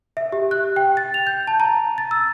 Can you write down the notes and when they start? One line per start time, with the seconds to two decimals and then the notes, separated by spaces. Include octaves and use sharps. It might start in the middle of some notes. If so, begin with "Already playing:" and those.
0.17 E5
0.32 G4
0.51 F#6
0.76 G5
0.97 A6
1.14 F7
1.27 G6
1.47 A5
1.60 A#5
1.98 A6
2.11 E6